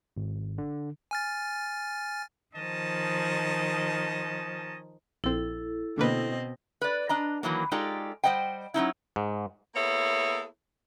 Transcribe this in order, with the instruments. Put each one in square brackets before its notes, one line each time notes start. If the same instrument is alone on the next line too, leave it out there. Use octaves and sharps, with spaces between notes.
[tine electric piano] G#1
D3
[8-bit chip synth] G#5 F6 A6
[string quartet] D#3 F3 [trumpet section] C#4 D#5 A5
[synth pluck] A#1 C4 [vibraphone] E4 A4
[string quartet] B2 C4 D#5 [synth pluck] D3 A#3 B4
[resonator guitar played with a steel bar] B4 D5
D4 D#5 A#5
D#3 E3 F#3 A#3
G#3 D#4 F4 G4 A4 D5
G3 C5 D#5 F#5 G5
F#3 C#4 D#4 E4
[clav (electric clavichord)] G#2
[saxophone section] A#3 B3 E4 G#4 A4 C#5